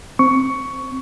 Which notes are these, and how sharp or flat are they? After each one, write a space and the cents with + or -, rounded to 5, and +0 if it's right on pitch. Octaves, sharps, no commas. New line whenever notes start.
C4 +0 C#6 +10